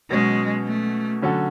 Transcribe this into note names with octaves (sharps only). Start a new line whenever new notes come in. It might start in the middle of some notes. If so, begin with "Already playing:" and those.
B2 F#3 G#3 C#4
A3
D3 F#3 C#4 F#4 A4